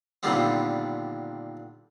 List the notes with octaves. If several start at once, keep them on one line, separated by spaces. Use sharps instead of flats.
A#2 D3 D#3 G3 B3 C4